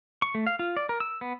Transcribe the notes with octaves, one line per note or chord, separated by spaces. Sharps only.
C#6
A3
F5
F4
D5
A#4
E6
B3